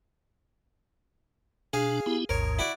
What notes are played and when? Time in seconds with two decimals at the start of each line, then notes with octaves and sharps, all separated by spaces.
1.73 B2 D4 G#4 F5
2.06 B3 E4 G4
2.29 A1 D#2 G#2 A#4 C#5
2.59 E4 F#4 D5